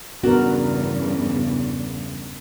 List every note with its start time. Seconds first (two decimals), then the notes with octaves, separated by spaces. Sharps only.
0.23 E2 G2 C#3 B3 D4 F#4 A#4